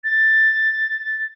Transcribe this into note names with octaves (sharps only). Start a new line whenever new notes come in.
A6